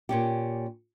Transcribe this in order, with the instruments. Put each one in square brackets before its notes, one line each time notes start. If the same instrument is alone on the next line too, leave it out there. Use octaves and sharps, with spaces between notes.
[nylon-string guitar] A#2 C#4 G4